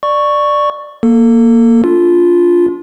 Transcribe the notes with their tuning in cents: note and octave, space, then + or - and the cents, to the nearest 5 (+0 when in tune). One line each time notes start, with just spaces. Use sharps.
D5 +10 C#6 +0
A#3 +0 A4 +15
D4 -35 F4 +0